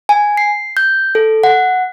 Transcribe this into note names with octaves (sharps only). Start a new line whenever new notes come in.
G#5
C7
G6
A4
F#5